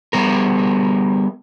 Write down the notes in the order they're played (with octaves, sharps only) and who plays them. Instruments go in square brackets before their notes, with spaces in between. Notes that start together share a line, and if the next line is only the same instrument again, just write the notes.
[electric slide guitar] G3 B3 A#4